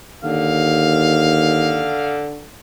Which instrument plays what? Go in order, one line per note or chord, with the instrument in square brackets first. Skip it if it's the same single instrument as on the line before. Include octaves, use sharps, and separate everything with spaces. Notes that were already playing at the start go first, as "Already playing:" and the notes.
[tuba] D#2 [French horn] D3 [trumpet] F5